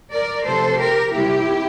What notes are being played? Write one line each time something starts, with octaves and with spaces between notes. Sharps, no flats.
A#4 D5
C3 F3 A3 A4 C5
G4 A#4
C3 G3 A#3 E4 G4